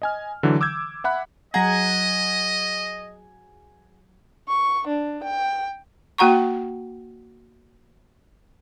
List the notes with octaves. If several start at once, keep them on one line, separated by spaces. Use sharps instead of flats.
D#5 G#5 F6
D3 E3 F#3
D6 E6 G6 G#6
E5 F#5 B5 F#6
F#3 G#4 D#5 F#5 A#5 G#6
C#6
D4
G5
A#3 F#4 F#5 A#5 C#6